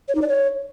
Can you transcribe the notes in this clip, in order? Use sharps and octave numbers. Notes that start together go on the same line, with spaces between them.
C#5
D#4
D5
C#5